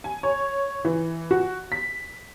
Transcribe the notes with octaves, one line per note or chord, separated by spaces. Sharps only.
G#5
C#5
E3
F#4
B6